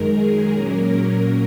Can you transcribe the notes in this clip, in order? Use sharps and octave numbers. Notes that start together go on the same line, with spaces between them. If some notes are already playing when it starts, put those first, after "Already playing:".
Already playing: F#2 D#3 G#3 A#4
G#4
A#2 F#3 A#3 C#4 A#4